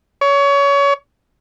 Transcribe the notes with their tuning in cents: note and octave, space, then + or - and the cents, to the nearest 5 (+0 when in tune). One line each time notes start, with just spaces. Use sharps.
C#5 +25